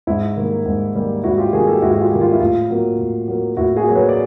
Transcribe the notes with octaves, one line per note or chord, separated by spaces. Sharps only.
G#2 E4
D#3 G3 A#3
G#2
D#3 G3 A#3
G#2 E4 F#4
F4 G4
D#3 G3 A#3 F#4 G#4
G4 A4
G#2 E4 F#4
F#4
F4 G4
D#3 G3 A#3
F4
E4
A2 F4
F#3 A#3
A2
F#3 A#3
A2 E4 F#4
F#4 G#4
F#3 A#3
B4 C#5
D5